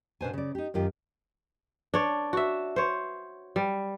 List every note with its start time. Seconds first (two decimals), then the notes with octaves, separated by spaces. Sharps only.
0.21 B2 D4 C5 G#5
0.33 C#3 D5
0.55 D#4 G4
0.74 F#2 D#3 F4 G4
1.94 D4 C#5
2.33 F#4 E5
2.76 C5 C#5
3.56 G3